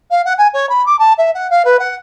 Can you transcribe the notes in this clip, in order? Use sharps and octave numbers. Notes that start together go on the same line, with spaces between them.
F5
F#5
G#5
C#5
B5
D6
A5
E5
F#5
F5
B4
F#5